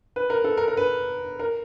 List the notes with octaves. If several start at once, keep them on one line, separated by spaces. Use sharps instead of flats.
B4
A#4
A4
A#4
A#4
B4
A#4